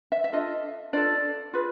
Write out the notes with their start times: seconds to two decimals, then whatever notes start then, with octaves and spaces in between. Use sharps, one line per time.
0.12 E5
0.24 E5
0.32 D4 F4 A4 D#5
0.93 D4 F4 A4 D5
1.53 F4 G#4 B4